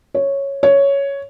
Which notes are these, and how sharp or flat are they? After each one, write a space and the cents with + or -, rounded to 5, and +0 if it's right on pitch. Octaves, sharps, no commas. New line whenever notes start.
C#5 -5
C#5 +5